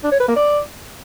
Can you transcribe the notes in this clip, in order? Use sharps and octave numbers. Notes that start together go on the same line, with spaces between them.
D4
C#5
B4
A#3
D5